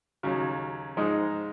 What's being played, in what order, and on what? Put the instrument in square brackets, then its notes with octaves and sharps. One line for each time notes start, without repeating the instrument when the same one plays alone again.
[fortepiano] D#2 C#3 F#3
G#2 F3 G#3 D#4